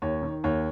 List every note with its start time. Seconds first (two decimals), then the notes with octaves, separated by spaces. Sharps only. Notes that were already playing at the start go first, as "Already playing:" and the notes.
0.02 D#2 C#5
0.23 D#3
0.44 D#2 C#5